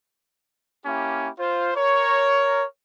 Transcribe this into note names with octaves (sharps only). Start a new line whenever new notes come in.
A#3 C#4 E4 G4
F4 C5
A#4 C#5